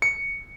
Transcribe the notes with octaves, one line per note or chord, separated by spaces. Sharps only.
C#7